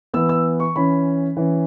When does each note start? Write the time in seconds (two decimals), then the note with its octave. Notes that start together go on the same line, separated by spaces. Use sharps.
0.14 E3 B3 E6
0.29 E6
0.60 C#6
0.76 E3 C#4 B5
1.37 E3 C#4